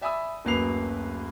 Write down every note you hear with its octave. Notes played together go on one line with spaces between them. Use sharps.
D5 E5 G#5 B5 D#6 E6
D1 F#2 A#3 B4 C7 F7